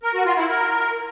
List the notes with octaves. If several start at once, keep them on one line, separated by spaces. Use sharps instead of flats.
A#4
F#4
F4
E4
A#4